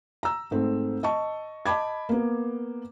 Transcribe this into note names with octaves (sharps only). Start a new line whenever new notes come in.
A#5 E6
G#2 A3 C4
D#5 A5 C#6
D#5 A5 B5 D6 G#6
A#3 B3